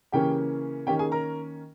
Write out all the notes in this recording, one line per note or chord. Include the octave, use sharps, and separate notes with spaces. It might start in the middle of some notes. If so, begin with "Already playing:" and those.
C#3 E3 A#3 C#4 G4 G5
D#3 A#3 C#4 G4 G5
G#4 G#5
A#4 A#5